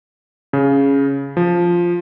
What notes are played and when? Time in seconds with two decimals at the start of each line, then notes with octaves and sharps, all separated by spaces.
0.53 C#3
1.37 F3